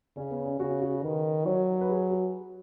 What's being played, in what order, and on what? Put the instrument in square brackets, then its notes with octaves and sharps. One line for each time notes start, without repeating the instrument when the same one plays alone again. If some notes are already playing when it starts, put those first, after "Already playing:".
[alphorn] C#3 [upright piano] C#4
[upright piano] B3
C#4
[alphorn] C#3 [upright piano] F#4
[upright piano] F#4
[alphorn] D#3 [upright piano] B4
[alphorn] F#3 [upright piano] C#5
[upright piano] B4
G#4
F#4